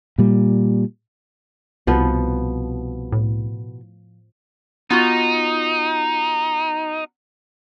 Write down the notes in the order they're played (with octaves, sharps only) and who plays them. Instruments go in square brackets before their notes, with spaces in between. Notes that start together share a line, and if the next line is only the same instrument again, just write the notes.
[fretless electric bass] A#2 G3
[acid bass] C2 [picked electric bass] B2 [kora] F3 B3
[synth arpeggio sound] A2
[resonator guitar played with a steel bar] B3 F4 F#4 [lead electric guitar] D#4